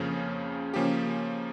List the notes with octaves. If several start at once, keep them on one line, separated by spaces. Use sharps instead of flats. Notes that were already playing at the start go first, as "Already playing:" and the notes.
Already playing: F2 C#3 F3 A#3 C#4 G#4
C#3 F3 A#3 C#4 G4